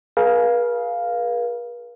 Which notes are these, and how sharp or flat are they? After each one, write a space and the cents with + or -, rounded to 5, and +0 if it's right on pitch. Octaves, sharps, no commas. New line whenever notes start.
G#4 +25 B4 -45 F5 +0